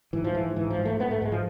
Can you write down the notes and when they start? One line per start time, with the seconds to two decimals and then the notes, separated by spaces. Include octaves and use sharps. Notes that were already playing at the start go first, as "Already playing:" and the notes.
0.13 G#2 E3
0.24 F3
0.35 G#2 E3
0.56 G#2 E3
0.70 F3
0.78 G#2
0.85 A3
1.00 G#2 B3
1.11 A3
1.22 G#2 G#3
1.32 F3